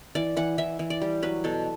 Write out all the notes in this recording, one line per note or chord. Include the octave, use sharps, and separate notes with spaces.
E3 D5
E3 F#5
E3 E5
E3
D5
G3
F#3 B4
B2 A4